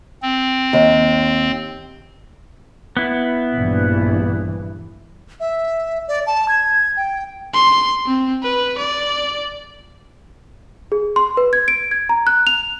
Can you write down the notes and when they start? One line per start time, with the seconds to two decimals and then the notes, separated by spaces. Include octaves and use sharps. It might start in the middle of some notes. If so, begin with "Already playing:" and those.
0.22 C4
0.73 D#2
2.97 B3 E4
3.54 A#1 G2 E3
5.40 E5
6.08 D5
6.27 A5
6.48 G#6
6.97 G5
7.53 C6
8.06 C4
8.43 B4
8.78 D5
10.92 G#4
11.16 C6
11.37 B4
11.53 G#6
11.68 D7
11.91 G#6
12.09 A#5
12.27 F#6
12.47 F7